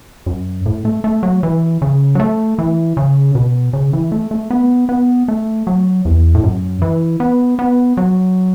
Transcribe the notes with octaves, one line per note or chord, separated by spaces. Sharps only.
F#2
A2
A3
A3
F#3
E3
C#3
F#3
A3
E3
C#3
B2
C#3
E3
A3
A3
B3
B3
A3
F#3
E2
A2
F#2
E3
B3
B3
F#3